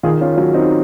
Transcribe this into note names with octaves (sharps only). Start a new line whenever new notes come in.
D#3 F4 G#4
C#4 F4
F#3 C#4 F4
C4 D#4